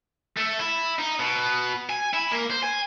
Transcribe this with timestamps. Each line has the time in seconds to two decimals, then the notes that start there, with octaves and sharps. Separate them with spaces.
0.37 A3
0.59 E4
0.99 D#4
1.20 B2
1.89 G#5
2.13 E4
2.31 A#3
2.50 C5
2.63 G#5